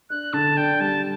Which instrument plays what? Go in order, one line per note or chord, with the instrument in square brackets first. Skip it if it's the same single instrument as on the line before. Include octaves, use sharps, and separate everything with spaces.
[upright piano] D4 [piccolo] F#6
[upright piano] D3 [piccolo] A5
[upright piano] D4 [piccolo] G5
[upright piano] G3 [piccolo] A5